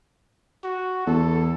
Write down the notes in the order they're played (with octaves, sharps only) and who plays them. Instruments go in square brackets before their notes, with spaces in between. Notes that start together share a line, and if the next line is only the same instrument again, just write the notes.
[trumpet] F#4
[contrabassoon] E2 [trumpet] A4